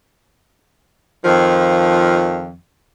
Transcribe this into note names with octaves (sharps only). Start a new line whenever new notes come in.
F2 D#3 F3